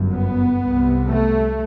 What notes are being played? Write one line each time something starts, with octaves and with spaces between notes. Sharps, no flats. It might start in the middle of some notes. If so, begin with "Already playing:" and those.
Already playing: G1 F#2
B3
C2 C3
A3